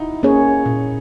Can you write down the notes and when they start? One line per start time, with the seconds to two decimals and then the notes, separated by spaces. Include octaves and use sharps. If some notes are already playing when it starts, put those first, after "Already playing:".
Already playing: D#4 E4 F#4
0.23 A#3 C#4 G#4 C#5
0.66 A#2